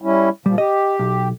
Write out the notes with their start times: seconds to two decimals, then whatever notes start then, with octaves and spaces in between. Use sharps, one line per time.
0.02 G3 C#4 E4
0.46 A#2 F3 G3
0.58 G4 D#5
0.99 B1